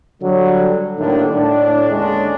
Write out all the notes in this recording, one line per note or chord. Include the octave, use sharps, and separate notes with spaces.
D3 F#3 G3
A2 D3 D#3 G3 A#3 D4
A2 D4
D#2 D3 G#3 C#4 D4